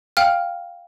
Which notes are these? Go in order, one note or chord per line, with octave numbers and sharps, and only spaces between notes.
F5 G5 F6